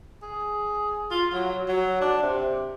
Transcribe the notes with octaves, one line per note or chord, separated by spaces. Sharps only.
G#4
F4
F#3
F#3
D4
C3